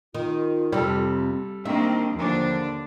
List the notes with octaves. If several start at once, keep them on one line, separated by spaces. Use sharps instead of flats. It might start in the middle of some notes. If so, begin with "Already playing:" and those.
D#3 F4
F2 C3 G3 A4
D#3 A#3 C4 D4 E5
D#2 D3 F3 D4